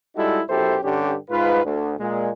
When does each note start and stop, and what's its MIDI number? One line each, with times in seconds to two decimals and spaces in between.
0.16 0.40 55
0.16 0.40 56
0.16 0.40 63
0.16 0.40 64
0.16 0.40 66
0.16 0.40 69
0.49 0.77 35
0.49 0.77 42
0.49 0.77 64
0.49 0.77 67
0.49 0.77 69
0.49 0.77 72
0.83 1.15 43
0.83 1.15 50
0.83 1.15 61
0.83 1.15 67
1.30 1.60 44
1.30 1.60 65
1.30 1.60 71
1.64 1.94 38
1.99 2.30 46
1.99 2.30 56